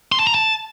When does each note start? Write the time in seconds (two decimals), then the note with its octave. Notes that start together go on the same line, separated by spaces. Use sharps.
0.12 C6
0.19 A5
0.27 A#5
0.34 A5